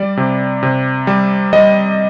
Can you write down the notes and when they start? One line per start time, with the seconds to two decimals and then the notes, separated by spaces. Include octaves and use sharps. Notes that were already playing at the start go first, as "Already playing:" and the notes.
Already playing: G3 D5
0.17 C3
0.63 C3
1.07 G3
1.53 G3 D#5